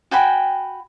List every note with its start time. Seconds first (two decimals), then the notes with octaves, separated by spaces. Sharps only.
0.11 F#4 G5 G#5 B5